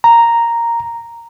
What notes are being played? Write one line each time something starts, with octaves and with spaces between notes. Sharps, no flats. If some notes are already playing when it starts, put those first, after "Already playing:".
A#5